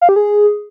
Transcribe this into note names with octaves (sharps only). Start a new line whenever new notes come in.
F5
G4
G#4